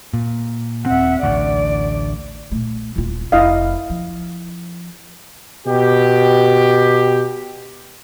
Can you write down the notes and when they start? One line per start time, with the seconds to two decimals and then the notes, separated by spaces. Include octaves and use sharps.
0.13 A#2
0.86 D#1 C4 E5 F#5
1.23 A1 D2 D5
2.51 A#2 A3
2.96 D#1 F4
3.32 F1 E4 D#5 F5
3.90 F3
5.66 B2 G4